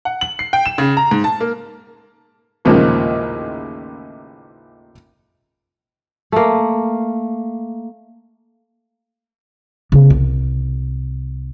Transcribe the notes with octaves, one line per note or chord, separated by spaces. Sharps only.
F#5
F#7
C7
G5
E7
C#3
A#5
G#2
A5
A#3
A1 D#2 A#2 C#3 F3 G#3
A3 A#3
C#3 B3
C2